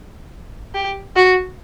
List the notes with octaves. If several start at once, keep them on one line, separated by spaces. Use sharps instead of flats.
G4
F#4